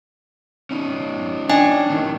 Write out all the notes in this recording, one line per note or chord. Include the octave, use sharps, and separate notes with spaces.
C#4 D#4
D4 D#5 G5 G#5
A2 D#3